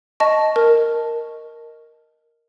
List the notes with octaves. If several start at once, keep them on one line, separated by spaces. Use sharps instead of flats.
D#5 A5 C#6
A#4